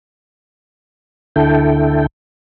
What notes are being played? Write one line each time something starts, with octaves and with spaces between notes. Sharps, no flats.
D2 D3 E4 A4 G5